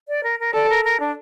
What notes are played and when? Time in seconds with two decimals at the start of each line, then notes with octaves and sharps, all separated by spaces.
0.09 D5
0.23 A#4
0.40 A#4
0.54 A4 D5
0.70 A#4
0.85 A#4
1.00 D4